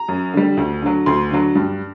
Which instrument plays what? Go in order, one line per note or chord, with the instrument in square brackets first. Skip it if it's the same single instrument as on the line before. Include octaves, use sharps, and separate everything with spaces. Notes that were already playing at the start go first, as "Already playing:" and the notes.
Already playing: [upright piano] A#5
F#2
D3 G3
D2
D3 F#3
D2 C6
D3 F#3
G2